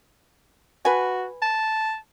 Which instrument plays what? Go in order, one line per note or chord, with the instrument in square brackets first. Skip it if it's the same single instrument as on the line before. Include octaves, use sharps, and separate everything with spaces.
[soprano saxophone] F#4 [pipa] B4 G#5
[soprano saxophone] A5